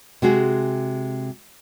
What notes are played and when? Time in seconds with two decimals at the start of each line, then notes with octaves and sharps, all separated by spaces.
0.22 C3 G#3 F#4 G#4